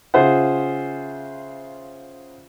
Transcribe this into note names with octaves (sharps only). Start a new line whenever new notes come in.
C#3 F4 G#4 C5 E5 F#5